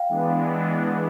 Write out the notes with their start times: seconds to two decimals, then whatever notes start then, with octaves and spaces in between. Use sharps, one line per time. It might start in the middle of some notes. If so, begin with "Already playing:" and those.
Already playing: F5 G5
0.09 E3 G#3 B3 D4